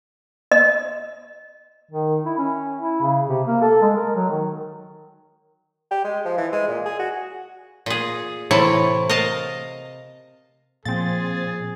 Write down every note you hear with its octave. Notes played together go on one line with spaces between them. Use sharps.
D#5
D#3
E4
C#4
E4
C#3
C3
A#3
A4
G#3
A#4
F#3
D#3
G4
G#3
F3
E3
G#3
A#2
G#4
F#4
A#2 G#4
A2 C3 E3 E4 C#5 A5
A#4 D#5 F5 A5
A#2 F3 C4 G#4 A6